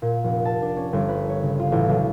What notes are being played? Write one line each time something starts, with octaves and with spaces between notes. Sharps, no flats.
A#2
F1
A5
D4
C#4
G1
B4
C#5
C#3
F4
A1
B1